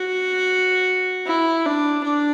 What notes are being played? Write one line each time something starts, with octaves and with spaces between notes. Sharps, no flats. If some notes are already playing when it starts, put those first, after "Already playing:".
Already playing: F#4
E4
D4
D4